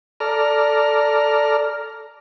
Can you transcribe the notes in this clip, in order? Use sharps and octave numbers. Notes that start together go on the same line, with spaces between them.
A4 D5 A#5 F6